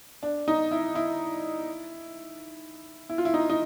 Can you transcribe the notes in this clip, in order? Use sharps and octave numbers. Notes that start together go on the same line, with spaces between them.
D4
D#4
E4
E4
E4
F4
E4
D#4
D#4